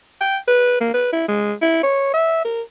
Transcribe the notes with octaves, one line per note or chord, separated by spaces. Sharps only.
G5
B4
A#3
B4
E4
G#3
E4
C#5
E5
A#4